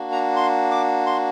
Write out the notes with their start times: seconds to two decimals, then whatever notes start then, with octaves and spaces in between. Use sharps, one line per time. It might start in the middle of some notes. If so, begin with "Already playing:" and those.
Already playing: A#3 D4 F#4
0.12 A#5
0.36 C6
0.71 D6
1.06 C6